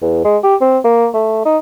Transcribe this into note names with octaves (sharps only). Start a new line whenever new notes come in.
E2
G#3
G4
C4
A#3
A3
D#4